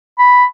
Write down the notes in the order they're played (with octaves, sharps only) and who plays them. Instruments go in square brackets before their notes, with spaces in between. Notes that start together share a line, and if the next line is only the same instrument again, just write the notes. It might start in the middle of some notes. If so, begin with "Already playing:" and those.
[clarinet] B5